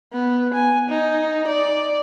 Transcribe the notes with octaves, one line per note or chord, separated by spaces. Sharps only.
B3
G#5
D#4
D5